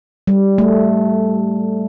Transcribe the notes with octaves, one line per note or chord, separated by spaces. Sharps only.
G3
A3